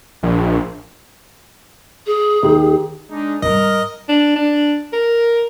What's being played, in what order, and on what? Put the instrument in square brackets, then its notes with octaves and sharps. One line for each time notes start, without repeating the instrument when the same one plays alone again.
[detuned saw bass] A#1
[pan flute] G#4
[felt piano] D#2 G4
[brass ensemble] G#3 D4 D#4
[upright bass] G#2 G3 [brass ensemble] A#4 [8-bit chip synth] D#5
[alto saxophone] D4
D4
A#4